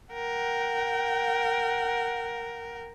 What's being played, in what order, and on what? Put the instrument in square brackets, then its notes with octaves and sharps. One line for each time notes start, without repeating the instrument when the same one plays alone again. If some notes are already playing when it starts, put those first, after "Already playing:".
[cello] A#4 [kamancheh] F#5 G5